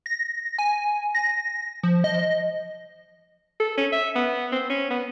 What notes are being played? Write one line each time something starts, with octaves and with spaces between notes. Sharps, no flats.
A#6
G#5
A#6
F3
D#5
A4
C#4
E5
B3
C4
C#4
B3